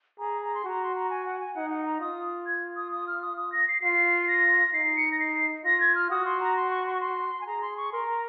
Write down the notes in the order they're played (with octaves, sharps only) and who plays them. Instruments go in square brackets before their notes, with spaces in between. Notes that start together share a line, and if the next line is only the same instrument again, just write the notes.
[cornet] G#4 [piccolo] A#5
[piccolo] A#5
C6
[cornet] F#4 [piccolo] A#5
[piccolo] C6
A#5
G#5
F#5
G#5
[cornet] D#4 [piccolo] F#5
[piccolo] F#5
A#5
[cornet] F4 [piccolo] D#6
[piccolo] G#6
D#6
D#6
F6
D#6
D#6
A#6
C7
[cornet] F4 [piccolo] C7
[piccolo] A#6
[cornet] D#4 [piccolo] C7
[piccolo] C#7
A#6
C7
[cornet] F4 [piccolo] A#6
[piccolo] G#6
F6
[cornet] F#4 [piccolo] D#6
[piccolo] C6
A#5
C6
C#6
C6
C#6
C6
G#5
[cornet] G#4 [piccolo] A#5
[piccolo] C6
C#6
[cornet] A#4 [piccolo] C6
[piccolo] A#5